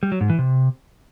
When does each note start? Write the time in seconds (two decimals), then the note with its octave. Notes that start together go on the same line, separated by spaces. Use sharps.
0.03 G3
0.12 F#3
0.21 G#2
0.30 E3
0.39 C3